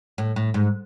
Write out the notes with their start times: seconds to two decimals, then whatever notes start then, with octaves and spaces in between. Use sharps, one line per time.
0.18 A2
0.36 A2
0.54 G#2